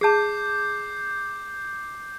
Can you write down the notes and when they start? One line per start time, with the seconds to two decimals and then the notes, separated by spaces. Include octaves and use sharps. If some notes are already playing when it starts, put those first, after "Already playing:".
0.01 G#4 A5 D6 G6 C7